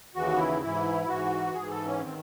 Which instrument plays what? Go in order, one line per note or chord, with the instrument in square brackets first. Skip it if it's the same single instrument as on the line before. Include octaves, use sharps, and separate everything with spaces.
[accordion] D#2 C#3 E3 F#4
E4
G#2 E3 E4
G#2 E3 F#4
G#2 E3 G#4
A4
C#4
D#3 C4